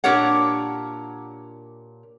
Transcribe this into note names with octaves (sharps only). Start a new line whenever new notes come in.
A#2 D4 G4 A#4 C#5 F#5